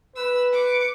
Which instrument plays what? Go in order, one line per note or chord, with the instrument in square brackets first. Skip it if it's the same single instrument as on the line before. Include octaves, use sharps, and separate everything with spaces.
[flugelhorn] B4 [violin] E6
[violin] D6 C#7